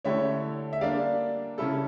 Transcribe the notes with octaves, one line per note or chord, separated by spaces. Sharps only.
D3 A3 C#4 E4 G4 C#5 E5
E5
G3 A#3 D4 D5 F5
C#3 G3 C#4 E4 A4